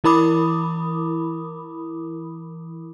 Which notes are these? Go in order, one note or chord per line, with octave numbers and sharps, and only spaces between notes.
E3 E4 A#4 B5 D6 D#6